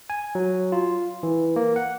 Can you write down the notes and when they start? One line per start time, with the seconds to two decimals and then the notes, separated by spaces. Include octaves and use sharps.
0.10 G#5
0.35 F#3
0.72 F4
1.23 E3
1.56 A#3
1.76 F#5